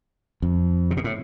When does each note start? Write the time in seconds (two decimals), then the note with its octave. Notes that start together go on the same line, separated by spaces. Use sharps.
0.42 F2
0.91 C3
0.97 B2
1.04 A2